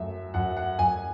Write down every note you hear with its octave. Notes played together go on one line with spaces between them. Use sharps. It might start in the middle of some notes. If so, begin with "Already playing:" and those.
Already playing: F#2 A3 E5
F#2 F#5
F#5
F#2 G#5